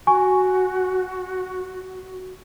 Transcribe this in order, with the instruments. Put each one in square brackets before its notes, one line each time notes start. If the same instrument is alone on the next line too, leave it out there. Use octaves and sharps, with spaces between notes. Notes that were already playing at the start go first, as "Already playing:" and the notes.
[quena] F#4 [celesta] G#5 C#6